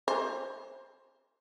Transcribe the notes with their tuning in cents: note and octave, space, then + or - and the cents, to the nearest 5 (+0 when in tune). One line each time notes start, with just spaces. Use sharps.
C5 +25